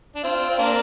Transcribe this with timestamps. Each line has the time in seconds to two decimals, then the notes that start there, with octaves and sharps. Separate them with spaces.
0.15 D4
0.24 C4 F4
0.49 C4
0.59 A#3 D4